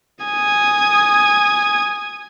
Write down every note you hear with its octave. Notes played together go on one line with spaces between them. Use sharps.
G#5 D#6